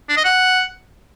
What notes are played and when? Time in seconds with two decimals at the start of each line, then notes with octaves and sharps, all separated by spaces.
0.09 D4
0.17 D#5
0.25 F#5